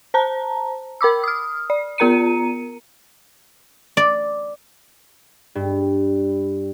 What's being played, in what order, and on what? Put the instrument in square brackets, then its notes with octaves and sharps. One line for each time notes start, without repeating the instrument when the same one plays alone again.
[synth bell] C5 A5 A#5
A#4 B5 D6 E6
D#6 F6
D5
B3 F4 A#4 A#5 C#7 D#7
[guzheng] D5
[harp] G2